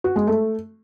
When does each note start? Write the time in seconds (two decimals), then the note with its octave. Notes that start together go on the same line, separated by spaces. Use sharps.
0.04 F#4
0.16 G#3
0.27 A3